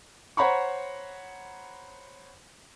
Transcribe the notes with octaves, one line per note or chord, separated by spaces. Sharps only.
C5 C#5 F#5 A#5 B5 C#6